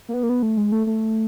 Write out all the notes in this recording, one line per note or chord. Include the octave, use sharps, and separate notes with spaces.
A#3
B3
A#3
B3
A3
G#3
A3
A3